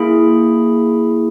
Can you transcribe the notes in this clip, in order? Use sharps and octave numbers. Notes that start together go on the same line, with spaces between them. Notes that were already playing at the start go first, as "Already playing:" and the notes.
Already playing: A#3 E4 G#4 B5